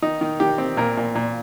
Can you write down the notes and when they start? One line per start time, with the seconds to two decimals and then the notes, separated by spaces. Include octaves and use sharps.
0.02 D#3 D#4
0.21 D#3
0.40 D#3 G4
0.58 C4
0.77 A#2 A#4
0.97 A#2
1.15 A#2